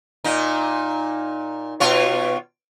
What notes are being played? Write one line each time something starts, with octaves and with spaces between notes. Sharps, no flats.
A#2 D#4
B2 F4 C#5